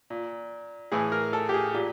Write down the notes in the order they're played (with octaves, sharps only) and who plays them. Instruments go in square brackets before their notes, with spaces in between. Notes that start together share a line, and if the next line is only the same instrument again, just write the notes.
[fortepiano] A#2
A2 E3 G#4
A#4
A4
G4
G#4
A#2 G4